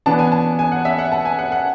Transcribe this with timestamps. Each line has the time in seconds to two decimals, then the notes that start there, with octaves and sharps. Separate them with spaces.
0.06 E3 B3 D4 A5
0.19 G#5
0.32 A5
0.59 G#5
0.72 F#5
0.85 E5
0.99 F#5
1.12 A5
1.25 G#5
1.39 F#5
1.52 F#5